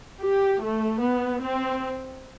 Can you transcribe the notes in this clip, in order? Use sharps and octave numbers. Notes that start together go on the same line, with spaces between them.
G4
A3
B3
C4